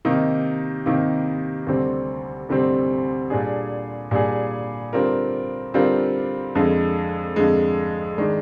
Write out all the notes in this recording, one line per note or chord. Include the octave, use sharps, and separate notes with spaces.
C3 D#3 A#3 D#4
C3 D#3 A#3 D#4
D2 C3 G3 C4
D2 C3 G3 C4
A#2 G3 D4 G#4
A#2 G3 D4 G#4
D3 G3 C4 F4 A#4
D3 G3 C4 F4 A#4
F2 D3 G#3
F2 D3 G#3
D#3 G#3 D4